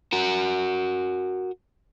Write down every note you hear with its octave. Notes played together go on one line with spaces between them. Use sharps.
F#4 A#4